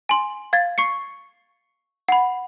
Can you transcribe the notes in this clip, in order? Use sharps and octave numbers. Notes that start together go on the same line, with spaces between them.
G#5 C6
F5 G#6 A6
C#6 C7 C#7
F#5 B5